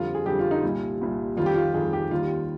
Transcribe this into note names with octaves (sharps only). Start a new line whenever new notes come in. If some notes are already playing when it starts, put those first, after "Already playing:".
Already playing: F2 D3 G3 F4
G#4
F2 D3 G3 G4
F4
D#4
C2 A#2 G3
C2 A#2 G3
F2 D#3 G3 F4
G4
F4
F2 D#3 G3 G#4
G4
D#2 D#3 G3 F4